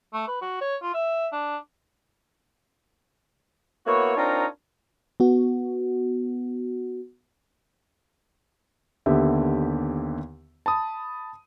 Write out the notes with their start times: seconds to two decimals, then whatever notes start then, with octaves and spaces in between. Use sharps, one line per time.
0.13 A3
0.28 B4
0.42 F#4
0.61 C#5
0.82 F4
0.94 E5
1.32 D4
3.86 A#3 B3 E4 F#4 C#5
4.17 C4 D4 D#4 F4 A#4 C#5
5.20 B3 F#4
9.06 D#2 D3 B3 G4 E5
10.66 A5 B5 D#6